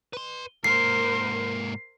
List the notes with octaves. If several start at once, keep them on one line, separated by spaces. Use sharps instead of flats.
B4 C6
G#2 A#3 A#4 C5 C7